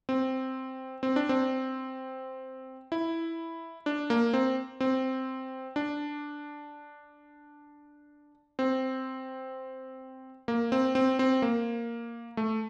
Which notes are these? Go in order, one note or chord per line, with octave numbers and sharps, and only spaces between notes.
C4
C4
D4
C4
E4
D4
A#3
C4
C4
D4
C4
A#3
C4
C4
C4
A#3
A3